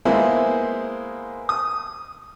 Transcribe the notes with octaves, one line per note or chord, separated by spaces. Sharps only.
G#3 A#3 B3 E4 G#4 C5
D#6